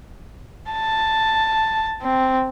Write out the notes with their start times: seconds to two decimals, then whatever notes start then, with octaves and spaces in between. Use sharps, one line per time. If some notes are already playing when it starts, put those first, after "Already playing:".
0.71 A5
2.02 C4